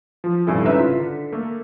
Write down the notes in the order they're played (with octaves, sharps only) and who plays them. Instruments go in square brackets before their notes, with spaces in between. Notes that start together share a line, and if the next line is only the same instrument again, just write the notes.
[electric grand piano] F3
A#1 G2 C3 E4 A4 G#5
G#1 C#3 D#4 B4 E5 A#5
F4 B6
D3
A3 A#3 A4